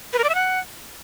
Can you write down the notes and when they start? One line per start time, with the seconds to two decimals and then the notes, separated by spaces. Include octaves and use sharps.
0.13 B4
0.19 A#4
0.24 D5
0.29 E5
0.35 F#5